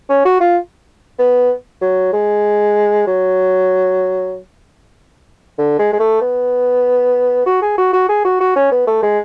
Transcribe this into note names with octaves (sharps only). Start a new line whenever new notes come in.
C#4
F#4
F4
B3
F#3
G#3
F#3
D3
G#3
G#3
A3
B3
F#4
G#4
F#4
F#4
G#4
F#4
F#4
C#4
B3
A3
G#3